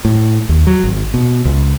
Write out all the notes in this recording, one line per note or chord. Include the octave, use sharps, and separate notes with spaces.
A2
D#2
F#3
G#1
B2
C#2